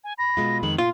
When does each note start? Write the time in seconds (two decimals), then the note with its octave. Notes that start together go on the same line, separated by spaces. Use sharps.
0.04 G#5
0.19 B5 A#6
0.37 B2 G#3 F4
0.63 F2 D#3 G#3 F#7
0.78 A#2 F4 C6